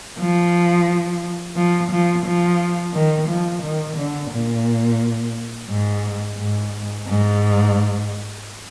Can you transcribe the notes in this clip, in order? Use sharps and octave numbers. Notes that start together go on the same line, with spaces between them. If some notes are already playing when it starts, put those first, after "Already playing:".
F3
F3
F3
F3
D#3
F3
D#3
D3
A#2
G#2
G#2
G#2